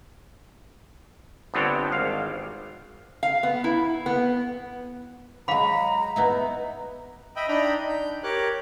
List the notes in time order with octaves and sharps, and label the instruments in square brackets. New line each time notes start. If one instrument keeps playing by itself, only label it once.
[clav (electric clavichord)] G1 B3 C4 D4 C#5 G5
G#1 F5
[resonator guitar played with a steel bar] F5
B3
E4
B3
[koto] F#3 G#3 [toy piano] F5 B5 [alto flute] A#5
[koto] B3 D#4 E4
[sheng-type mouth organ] D#5 E5 G5 B5
D4 D#4 G5 A#5 B5
G6
G4 A#4 C#5 D6 F#6